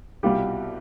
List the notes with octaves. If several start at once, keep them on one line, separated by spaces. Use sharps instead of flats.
C2 B2 G3 F4 G4